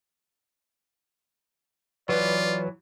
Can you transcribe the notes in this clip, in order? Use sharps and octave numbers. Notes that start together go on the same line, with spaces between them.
E3 F#3 F4 B4 D5